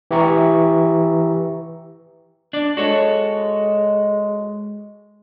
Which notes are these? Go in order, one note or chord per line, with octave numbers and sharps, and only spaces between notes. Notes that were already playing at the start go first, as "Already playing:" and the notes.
E3 G4 E5 A#5 C#6
D4 D5
G#3 F#4 A4 C#5